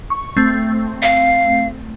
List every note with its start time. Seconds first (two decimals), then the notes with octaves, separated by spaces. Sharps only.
0.10 C#6
0.37 A3 C4
1.02 F5